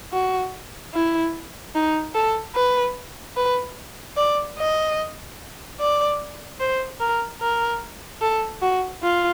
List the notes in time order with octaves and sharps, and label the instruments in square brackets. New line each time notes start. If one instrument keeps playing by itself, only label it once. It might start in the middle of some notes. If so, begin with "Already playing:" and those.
[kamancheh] F#4
E4
D#4
A4
B4
B4
D5
D#5
D5
C5
A#4
A#4
A4
F#4
F4